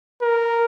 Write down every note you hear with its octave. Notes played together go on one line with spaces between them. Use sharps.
A#4